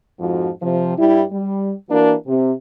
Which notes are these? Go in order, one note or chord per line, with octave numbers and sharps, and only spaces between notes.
F2 G#2 F3 F#4
C3 F3
G2 G3 E4
G3
E3 A#3 D4 F#4 A#4
C3